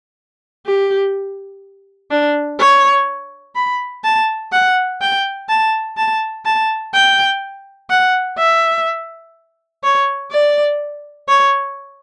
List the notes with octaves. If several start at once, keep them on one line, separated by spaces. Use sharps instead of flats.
G4
D4
C#5
B5
A5
F#5
G5
A5
A5
A5
G5
F#5
E5
C#5
D5
C#5